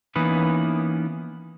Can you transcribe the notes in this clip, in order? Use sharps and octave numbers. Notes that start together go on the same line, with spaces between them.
E3 A#3 B3 C#4 D#4 B4